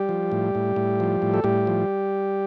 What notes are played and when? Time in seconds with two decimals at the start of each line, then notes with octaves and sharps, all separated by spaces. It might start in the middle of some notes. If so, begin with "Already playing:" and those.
Already playing: G3 G4
0.09 F3
0.32 A2
0.55 A2
0.76 A2
1.00 F3
1.22 A2
1.34 A4
1.44 A2 G3 G4
1.67 F3